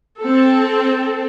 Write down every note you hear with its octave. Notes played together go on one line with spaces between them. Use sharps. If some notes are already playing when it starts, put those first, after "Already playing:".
C4 A4